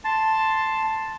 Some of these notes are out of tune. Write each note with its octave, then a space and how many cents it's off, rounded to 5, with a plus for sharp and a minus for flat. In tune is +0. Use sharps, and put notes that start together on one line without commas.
A5 +0 C6 +0